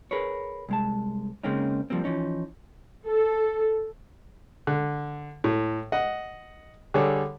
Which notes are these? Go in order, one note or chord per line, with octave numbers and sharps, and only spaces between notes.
G#4 A#4 B4 C#5
C2 G#3 A5
C#3 G#3 A#3 C4 C#4 D#4
F3 G3 A#3 C4
E3 F3 C#4 D#4
A4
D3
A2
D#5 F#5
D3 G3 G#4 A4 C#5